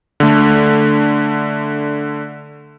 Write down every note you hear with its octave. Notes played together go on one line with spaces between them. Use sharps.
D3 A3